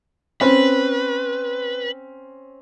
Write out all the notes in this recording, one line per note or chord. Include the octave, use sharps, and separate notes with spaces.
C4 C#4 B4